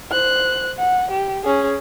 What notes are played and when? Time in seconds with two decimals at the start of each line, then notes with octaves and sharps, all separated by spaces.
0.11 C5 F#6
0.79 F#5
1.11 G4
1.43 C#4 G#4